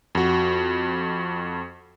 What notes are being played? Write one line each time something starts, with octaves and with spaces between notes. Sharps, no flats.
F2 F#4